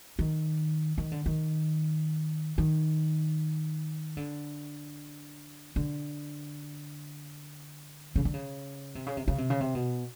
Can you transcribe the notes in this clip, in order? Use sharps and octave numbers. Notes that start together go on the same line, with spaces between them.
D#3
D#3
D3
D#3
D#3
D3
D3
C#3
D3
C#3
C3
C#3
C3
C#3
C3
C#3
C3
B2